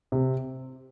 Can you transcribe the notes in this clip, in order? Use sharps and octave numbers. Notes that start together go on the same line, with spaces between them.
C3